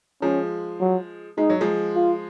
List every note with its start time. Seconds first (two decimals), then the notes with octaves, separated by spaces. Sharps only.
0.22 F3 G#3 C#4
0.80 F#3
1.38 G#3 D#4
1.50 F#3
1.61 F3 G#3
1.95 F4